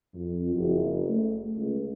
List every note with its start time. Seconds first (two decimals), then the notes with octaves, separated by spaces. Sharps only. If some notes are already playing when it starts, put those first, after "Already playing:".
0.14 F2
0.54 F#1
1.09 A3
1.55 C#2